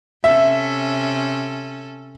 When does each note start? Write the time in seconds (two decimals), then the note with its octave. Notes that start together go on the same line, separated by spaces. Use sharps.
0.24 C3 C#4 A4 E5